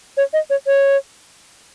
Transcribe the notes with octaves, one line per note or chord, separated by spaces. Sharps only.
C#5
D#5
C#5
C#5